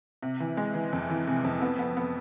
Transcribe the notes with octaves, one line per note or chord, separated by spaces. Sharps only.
C3
E3
G#3
E3
F2
E3
C3
F2
B3
B3
B3